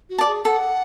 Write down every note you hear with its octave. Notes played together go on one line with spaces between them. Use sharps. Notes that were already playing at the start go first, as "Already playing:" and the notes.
F#4
D5 A5
G#4
A4 F#5